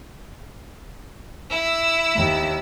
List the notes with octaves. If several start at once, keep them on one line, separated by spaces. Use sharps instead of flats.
E4 E6
D#2